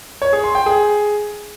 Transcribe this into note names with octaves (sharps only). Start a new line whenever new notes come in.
C#5
G#4
C6
G5
G#4